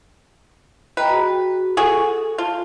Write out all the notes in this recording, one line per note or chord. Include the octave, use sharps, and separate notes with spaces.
B4 D#5 G5 A#5
F#4 G#4
F#4 G#4 A4
F4 A5